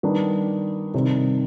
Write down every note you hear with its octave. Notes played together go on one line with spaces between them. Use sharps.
D#3 G3 B3 D4
C3 D#3 G3 C4